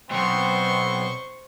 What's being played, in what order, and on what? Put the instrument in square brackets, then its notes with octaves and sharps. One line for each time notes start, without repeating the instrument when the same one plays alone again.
[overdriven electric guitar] B1 G#2 [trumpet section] B3 C4 [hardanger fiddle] C5 C#6